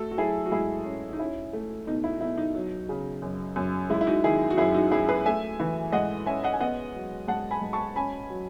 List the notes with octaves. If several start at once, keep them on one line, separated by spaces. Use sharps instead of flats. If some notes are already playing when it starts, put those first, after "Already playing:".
Already playing: A3 F#4 A4
F#4
F#3 E4 G#4
F#4
G#2 E4 G#4
C#4
D#4
C#4 E4
A3
B2 D#4
E4
B2 E4
D#4
F#3
C#3
F#2
F#2
G#3 E4
E4
D#4 F#4
D#3 E4 G#4
F#4
F#2 E4 G#4
D#4 F#4
F#2 E4 G#4
G#4 B4
A3 E5 G#5
E3
G#2 D#5 F#5
C#4 E5 G#5
D#5 F#5
G#5
B3 D#5 F#5
F#3
G#2 F#5 A5
G#5 B5
G#2
A5 C#6
C#4 G#5 B5
F#3